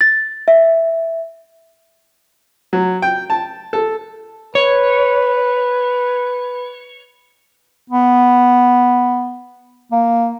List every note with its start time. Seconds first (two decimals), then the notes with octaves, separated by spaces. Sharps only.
0.01 A6
0.48 E5
2.73 F#3
3.02 G5
3.30 A5
3.73 A4
4.55 B4 C#5
7.90 B3
9.92 A#3